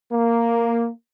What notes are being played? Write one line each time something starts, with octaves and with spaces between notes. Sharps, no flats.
A#3